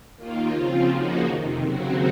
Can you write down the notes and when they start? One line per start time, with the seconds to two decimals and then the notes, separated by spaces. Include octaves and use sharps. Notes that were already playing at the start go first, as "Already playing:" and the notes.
0.16 D#2 D#3 A#3 F4
0.53 C#3 F3 C4 F4
0.88 C#3 F3 A#3 D#4 F#4
1.23 F2 C3 D#3
1.60 D#2 C#3 F#3 C4 F#4